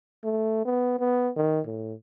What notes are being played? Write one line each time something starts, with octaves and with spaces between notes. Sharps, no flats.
A3
B3
B3
D#3
A2